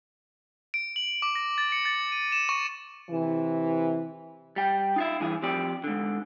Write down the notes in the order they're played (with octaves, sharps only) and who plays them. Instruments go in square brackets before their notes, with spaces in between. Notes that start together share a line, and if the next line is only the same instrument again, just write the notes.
[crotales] D7
F#7
D6
A#6
A6
C#7
A6
D#7
E7
C#6
[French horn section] C3 E3
[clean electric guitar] G3 G5
D#4 F4 E5
G2 E3 G#4
F3 C4 G4 D5
G#2 D3